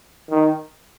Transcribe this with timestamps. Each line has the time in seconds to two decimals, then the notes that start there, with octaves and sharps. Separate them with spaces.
0.30 D#3